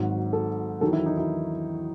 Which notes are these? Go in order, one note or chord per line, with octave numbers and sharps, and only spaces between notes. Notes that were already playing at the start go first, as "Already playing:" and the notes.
Already playing: G#1 G#2 F#3 F#4
A4
E2 D#3 F#3 A4
E4
D#4
E4